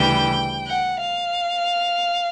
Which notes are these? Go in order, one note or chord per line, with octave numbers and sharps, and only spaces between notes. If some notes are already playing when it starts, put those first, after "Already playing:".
Already playing: D2 C#3 E3 G3 G5
F#5
F5